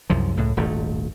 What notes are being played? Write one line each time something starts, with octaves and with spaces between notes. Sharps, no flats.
C2 F#2 F3
C#2 A2
D#1 G#1 G2 A3